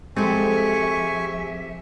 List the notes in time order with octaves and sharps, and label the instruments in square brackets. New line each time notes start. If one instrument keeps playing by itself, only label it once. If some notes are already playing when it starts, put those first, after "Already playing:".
[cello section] F3 G4 E5 [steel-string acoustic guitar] G#3 A4 [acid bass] C4 [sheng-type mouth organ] G#5 C#6